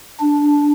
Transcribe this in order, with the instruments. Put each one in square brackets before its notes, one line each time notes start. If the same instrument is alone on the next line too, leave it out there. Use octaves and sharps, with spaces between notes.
[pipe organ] D4